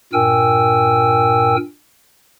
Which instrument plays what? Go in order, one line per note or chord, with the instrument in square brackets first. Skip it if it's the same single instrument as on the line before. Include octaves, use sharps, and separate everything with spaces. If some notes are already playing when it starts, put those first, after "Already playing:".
[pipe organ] G2 A#2 A#4 G5 G#5 E6